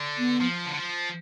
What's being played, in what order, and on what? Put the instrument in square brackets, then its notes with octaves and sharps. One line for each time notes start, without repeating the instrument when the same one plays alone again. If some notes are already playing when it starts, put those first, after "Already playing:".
Already playing: [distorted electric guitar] D3
[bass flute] B3
[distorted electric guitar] F3
D3
F3